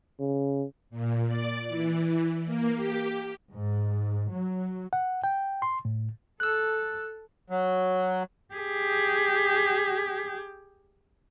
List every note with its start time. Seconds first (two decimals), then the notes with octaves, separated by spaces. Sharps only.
0.19 C#3
0.90 A#2
1.28 D5
1.68 E3
2.45 A#3
2.75 G4
3.52 G#2
4.31 F#3
4.93 F#5
5.24 G5
5.62 C6
5.85 A2
6.40 A4 E6 F#6
7.50 F#3
8.54 G4 G#4